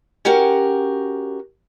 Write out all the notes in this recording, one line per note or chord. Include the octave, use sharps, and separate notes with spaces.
C#4 F#4 G4 A#4